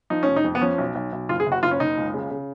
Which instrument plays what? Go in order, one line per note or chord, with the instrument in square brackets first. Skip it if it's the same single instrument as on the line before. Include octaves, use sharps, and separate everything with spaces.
[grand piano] F3 D#4
F1 C#4
D#4
F2
B3
F3 C#4
B1
B1
B1
F#1 F4
G#4
F#1
F#4
F#1 F4
C#4
F#1 D#4
C#2
C#3
C#3